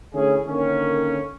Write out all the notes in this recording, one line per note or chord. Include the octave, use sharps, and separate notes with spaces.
D3 A3 C#4 E4 G#4
D3 D#3 A#3 C#4